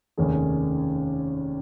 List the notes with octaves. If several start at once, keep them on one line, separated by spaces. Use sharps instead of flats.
F1 D#2 D#3 C#4 G#4